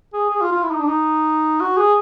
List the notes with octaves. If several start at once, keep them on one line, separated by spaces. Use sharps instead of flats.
G#4
G#4
F4
F4
E4
D#4
D4
D#4
F#4
G#4